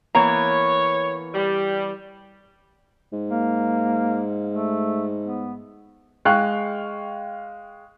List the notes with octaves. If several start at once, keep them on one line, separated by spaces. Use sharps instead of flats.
E3 A#3 B3 C#5 A#5
G3
G#2
A#3
A3
B3
G#3 F5 G5 C#6 F#6